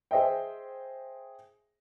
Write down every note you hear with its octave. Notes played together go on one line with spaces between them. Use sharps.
G#4 C5 D#5 E5 G5